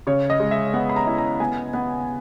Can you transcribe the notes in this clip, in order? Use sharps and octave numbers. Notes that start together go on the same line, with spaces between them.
C#3 C#5
D#5
G#3
E5
B3 F#5
B5
A#5
E4
A#5
B3 G#5
B3 F#5